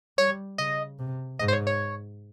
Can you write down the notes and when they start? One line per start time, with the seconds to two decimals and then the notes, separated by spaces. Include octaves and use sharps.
0.18 G3 C#5
0.58 C#3 D#5
0.99 C3
1.39 G#2 D#5
1.48 C5
1.53 C#5
1.67 C#5